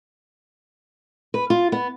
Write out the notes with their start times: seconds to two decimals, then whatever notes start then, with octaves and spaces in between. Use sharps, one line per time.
1.34 B4
1.50 F4
1.72 B3